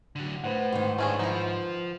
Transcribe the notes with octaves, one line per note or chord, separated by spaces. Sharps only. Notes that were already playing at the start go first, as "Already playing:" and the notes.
D3 F#3
A2 B4 C5 F#5
G#2 D#3
A2 A3 C#4 D4 G#4
F3 D#4 E4